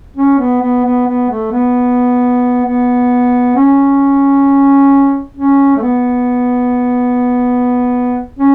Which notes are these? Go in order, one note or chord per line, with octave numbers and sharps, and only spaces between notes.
C#4
B3
B3
B3
B3
A3
B3
B3
C#4
C#4
A3
B3
C#4